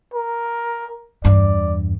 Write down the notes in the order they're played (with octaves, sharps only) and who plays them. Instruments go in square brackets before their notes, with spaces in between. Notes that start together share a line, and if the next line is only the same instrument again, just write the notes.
[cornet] A#4
[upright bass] E2 G2 [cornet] D5